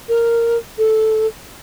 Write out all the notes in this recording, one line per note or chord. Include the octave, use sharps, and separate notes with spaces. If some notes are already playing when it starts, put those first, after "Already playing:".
A#4
A4